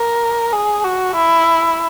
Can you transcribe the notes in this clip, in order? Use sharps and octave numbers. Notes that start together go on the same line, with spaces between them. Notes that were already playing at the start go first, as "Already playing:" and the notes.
Already playing: A#4
G#4
F#4
E4